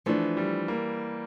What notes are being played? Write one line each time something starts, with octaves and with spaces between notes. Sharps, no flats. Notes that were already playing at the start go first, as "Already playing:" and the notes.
E3 F3 A3 D4
G3
A#3